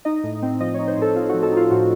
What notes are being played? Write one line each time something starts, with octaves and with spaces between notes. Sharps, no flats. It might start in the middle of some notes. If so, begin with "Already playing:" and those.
D#4 D#5
A2
C4
F3 D#5
D#4 C#5
C5
A2 A4
C4 F4
F3 F#4
A4
D#4 F4
A2 F#4